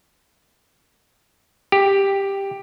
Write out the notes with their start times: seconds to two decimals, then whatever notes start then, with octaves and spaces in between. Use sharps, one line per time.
1.72 G4